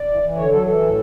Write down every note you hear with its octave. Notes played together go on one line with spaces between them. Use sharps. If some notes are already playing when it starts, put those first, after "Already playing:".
Already playing: D5
E3
E3
D3 C#5
F#3 A4
E3 A4
A2